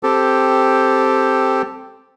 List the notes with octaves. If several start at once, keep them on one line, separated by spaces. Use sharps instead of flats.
C4 G4 A4